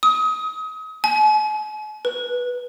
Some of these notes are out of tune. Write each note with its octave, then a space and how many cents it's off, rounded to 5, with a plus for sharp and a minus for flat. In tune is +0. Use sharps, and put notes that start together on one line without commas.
D#6 +35
G#5 +45
B4 -10